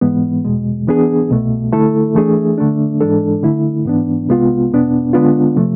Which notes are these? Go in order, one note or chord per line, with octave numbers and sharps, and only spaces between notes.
G#2 E3 G#3 B3
E2 B2 G#3
E3 B3 D4 G#4
C2 B2 A3
D3 A3 E4 A4
E3 A3 D4 G#4
D3 A3 D4
G#2 E3 G#3 D4 A4
D3 A3 E4
G#2 E3 B3 D4
C2 C3 G#3 B3 F4
E2 B2 B3 D4
D3 G#3 B3 D4 F4
C3 F3 A3